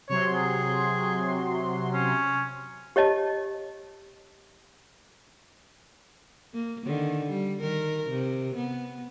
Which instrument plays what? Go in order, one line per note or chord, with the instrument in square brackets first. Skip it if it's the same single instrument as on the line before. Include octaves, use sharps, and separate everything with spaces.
[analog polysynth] C3 F#3 C6 [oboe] C#5
[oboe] G#4
C#4
[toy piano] G4 C#5 D#5 A5
[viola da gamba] A#3
D3 D#3
G3
D#3 A#4
C3
B3